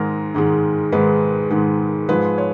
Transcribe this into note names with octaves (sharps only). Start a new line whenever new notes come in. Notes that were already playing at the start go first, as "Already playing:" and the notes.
Already playing: G#2 D#3 G#3 A#4
G#2 D#3 G#3
G#2 D#3 G#3 B4
G#2 D#3 G#3
G#2 F3 G#3 B4
C#5